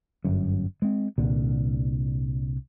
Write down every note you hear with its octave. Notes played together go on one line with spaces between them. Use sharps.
G1 F#2
G#3 C4
C2 A#2 D3